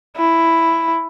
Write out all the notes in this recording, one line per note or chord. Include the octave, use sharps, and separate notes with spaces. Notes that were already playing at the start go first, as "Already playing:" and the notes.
E4